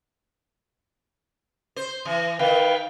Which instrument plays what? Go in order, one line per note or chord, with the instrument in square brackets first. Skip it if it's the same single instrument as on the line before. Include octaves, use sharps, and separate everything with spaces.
[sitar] C5
E3
[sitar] D#3 [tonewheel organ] B4 F5 G5